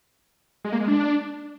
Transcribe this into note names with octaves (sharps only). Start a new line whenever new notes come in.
G#3
A#3
G#3
D4